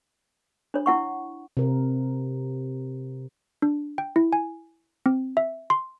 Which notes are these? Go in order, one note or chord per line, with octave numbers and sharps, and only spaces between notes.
D4 C#5
E4 F#5 C#6
C3 A#4
D4
G5
E4
G#5
C4
E5
C6